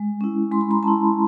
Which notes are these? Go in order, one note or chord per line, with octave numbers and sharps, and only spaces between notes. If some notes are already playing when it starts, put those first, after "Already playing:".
Already playing: G#3
C#4 E4
G#3 C6
B5
A#5 C6
C#4 E4 A5 B5